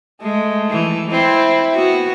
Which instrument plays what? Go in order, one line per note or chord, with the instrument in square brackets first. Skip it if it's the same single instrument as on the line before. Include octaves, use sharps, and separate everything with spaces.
[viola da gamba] G#3 [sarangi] A3
[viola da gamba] E3
[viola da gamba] C4 [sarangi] E4
[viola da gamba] B3 F#4